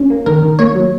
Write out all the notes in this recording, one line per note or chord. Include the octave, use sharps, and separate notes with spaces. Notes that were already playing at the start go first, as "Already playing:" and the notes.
Already playing: C#4
A#3
D#3 A#4
D#3
A#3 C#5
F#3